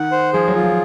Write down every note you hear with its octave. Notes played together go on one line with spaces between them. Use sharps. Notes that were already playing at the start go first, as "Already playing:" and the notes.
Already playing: D#3 F#5
C5
F3 G#4
F#3
F4
F3